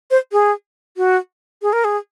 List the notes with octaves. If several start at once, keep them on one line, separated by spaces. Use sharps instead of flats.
C5
G#4
F#4
G#4
A#4
G#4